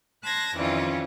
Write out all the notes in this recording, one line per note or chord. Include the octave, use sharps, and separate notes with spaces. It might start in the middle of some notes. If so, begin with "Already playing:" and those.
A5 B5 C6 F#6 G#6 A#6
F2 D#3 E3 G3 C#4 F4